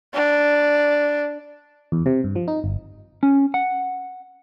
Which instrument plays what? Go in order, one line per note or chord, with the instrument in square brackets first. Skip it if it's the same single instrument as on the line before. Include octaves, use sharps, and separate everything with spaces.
[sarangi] D4
[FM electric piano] E2
C3
G2
F3
D#4
G1
[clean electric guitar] C#4
F#5